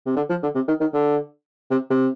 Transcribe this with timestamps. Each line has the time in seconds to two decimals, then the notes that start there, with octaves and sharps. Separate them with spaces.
0.06 C3
0.17 D3
0.30 F3
0.43 D3
0.55 C3
0.68 D#3
0.81 D#3
0.93 D3
1.71 C3
1.90 C3